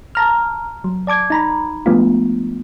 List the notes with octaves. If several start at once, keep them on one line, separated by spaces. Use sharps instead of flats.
A5 A#5 F6
F#3
D5 A5 D6 G#6
D#4 A#5 B5
F3 G#3 A3 B3 D4 F4